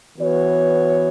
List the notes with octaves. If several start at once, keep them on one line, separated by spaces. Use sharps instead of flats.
E3 B3 F#4 C#5